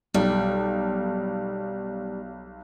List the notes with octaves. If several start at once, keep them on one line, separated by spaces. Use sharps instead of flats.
B1 G3